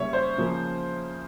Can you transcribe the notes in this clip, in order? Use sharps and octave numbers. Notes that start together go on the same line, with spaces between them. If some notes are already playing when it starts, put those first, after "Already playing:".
Already playing: C#3 G3 A#3 C#5 E5
C5
C#3 F3 A#3